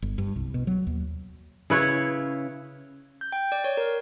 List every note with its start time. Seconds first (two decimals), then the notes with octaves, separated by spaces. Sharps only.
0.02 G1
0.18 G2
0.36 C2
0.54 B2
0.67 F#3
0.87 D#2
1.70 C#3 E4 B4 C#5
3.21 G6
3.32 G5
3.52 D5
3.64 C#5
3.77 A#4